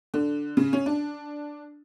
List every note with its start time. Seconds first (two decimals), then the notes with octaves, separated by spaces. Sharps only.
0.14 D3
0.57 C#3
0.73 C#4
0.86 D4